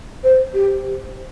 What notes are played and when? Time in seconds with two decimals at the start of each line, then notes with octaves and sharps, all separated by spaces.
0.24 C5
0.54 G4